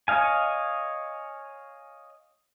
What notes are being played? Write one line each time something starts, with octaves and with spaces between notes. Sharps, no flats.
C#5 D#5 F5 G#5